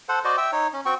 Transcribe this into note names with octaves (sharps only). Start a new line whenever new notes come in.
A4 C5 F#5
F#4 C5 D5 D#5
E5 G5 E6
D#4 C#5
C#4
C4 F#4 G5 C#6